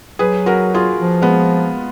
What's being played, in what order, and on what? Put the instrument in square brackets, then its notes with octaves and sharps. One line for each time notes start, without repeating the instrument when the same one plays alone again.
[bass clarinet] F#3 [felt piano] G#4 B4
[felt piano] F#4 A#4
F4 G#4
[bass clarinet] F3
[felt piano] G#3 B3